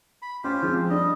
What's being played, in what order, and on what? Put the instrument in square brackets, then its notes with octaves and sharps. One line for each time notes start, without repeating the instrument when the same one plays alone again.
[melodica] B5
[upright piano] C#4 [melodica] F4 G4 C5
[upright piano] F3 G#3 C4
[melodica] G3 D#5 [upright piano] D4